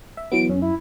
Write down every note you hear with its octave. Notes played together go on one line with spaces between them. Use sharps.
E5
E3 F#3 B3 D7
F#2 C#4
E4